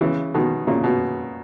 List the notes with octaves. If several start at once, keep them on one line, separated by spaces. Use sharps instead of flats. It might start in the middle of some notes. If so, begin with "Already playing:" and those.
C#3 E3
B2 D#3
A#2 C#3
B2